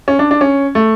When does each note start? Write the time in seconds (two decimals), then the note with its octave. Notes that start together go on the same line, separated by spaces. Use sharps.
0.08 C#4
0.19 D4
0.31 D4
0.41 C#4
0.75 A3